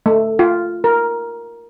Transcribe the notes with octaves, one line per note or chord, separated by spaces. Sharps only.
A3
F4
A#4